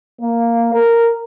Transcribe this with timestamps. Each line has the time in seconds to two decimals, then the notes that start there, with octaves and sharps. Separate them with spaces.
0.21 A#3
0.73 A#4